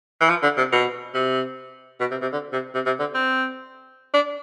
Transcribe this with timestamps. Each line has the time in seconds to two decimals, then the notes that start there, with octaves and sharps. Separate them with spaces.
0.21 E3
0.29 F3
0.43 D3
0.57 C3
0.72 B2
1.15 C3
2.00 B2
2.11 C3
2.22 C3
2.33 D3
2.53 C3
2.75 C3
2.86 C3
3.00 D3
3.14 C4
4.14 D4